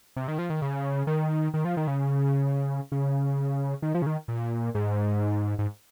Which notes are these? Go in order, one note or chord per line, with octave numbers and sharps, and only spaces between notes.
C3
D#3
F3
D#3
C#3
D#3
D#3
F3
D#3
C#3
C#3
D#3
F3
C#3
D#3
A#2
G#2
G#2